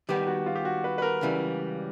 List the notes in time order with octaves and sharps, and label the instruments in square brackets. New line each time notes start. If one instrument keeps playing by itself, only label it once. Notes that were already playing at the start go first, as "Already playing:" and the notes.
[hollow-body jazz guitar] D#3 G3 B3 D#4 [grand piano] G4
[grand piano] F#4
F4
G4
F#4
B4
B4
A#4
[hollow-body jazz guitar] C#2 C#3 E3 G3